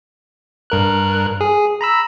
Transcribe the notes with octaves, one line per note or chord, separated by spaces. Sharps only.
G2 A#4 F#6
G#4
A#5 B5 E6